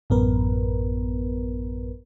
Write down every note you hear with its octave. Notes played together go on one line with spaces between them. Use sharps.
A1 F#2 B3 A#4 B4